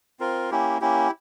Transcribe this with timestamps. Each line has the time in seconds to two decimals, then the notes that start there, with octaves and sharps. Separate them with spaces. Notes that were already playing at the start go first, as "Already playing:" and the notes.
0.20 C4 F4 A#4
0.51 A#3 C#4 E4 G4
0.80 A#3 C#4 E4 G4